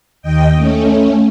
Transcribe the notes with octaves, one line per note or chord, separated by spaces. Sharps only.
D#2 D#5 G5
A3 C#4